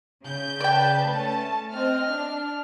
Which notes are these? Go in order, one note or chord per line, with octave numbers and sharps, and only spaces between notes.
C#3 G6
B4 D5 G5 A5
A3 C#4 A5
C4 D#5 F6
D4